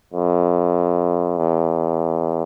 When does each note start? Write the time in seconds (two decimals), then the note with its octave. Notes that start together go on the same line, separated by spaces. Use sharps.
0.13 F2
1.38 E2